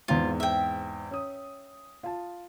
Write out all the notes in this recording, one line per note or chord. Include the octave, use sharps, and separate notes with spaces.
E2 G#2 C4 F4
E5 G5
C#4 D#6
F4 A5